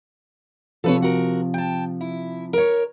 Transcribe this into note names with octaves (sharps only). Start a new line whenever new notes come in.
C3 F3 A4 B4 C#5
F#4 A#4
G5 A5
E4
A#4 C#5